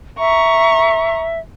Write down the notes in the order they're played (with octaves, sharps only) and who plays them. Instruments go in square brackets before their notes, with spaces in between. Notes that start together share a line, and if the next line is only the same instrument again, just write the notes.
[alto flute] E5 [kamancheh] A#5 C#6